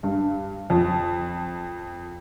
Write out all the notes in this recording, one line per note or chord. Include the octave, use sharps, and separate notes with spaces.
G2
F2